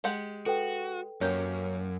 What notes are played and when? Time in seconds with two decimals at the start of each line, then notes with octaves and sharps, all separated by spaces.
0.04 G#3 G4 F#5
0.46 F#4 A4 B4 G5
1.21 F#2 A#3 C#4 G4